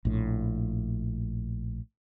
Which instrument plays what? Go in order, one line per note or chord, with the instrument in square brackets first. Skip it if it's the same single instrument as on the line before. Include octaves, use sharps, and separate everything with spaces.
[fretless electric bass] A#1 A2